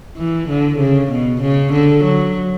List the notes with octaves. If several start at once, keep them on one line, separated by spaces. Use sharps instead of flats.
E3
D3
C#3
B2
C#3
D3
F#3